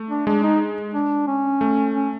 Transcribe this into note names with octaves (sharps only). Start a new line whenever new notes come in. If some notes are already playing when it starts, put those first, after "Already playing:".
Already playing: A3
D4
G#3 D4
D#4
D4
C#4
A3
C#4